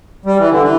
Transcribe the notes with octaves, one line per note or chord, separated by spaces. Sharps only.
G3
E3
D3
E3